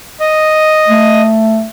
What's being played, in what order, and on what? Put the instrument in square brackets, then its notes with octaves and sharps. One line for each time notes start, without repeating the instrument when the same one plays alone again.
[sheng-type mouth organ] D#5
[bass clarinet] A3